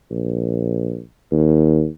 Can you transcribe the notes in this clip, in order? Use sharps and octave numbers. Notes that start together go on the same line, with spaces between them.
A#1
D#2